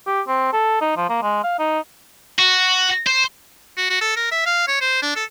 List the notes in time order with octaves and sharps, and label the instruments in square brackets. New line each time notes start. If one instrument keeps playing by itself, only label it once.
[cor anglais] G4
C4
A4
D#4
F3
A#3
G#3
F5
D#4
[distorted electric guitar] F#4
C5
[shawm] F#4
F#4
A4
A#4
E5
F5
C#5
C5
D4
A4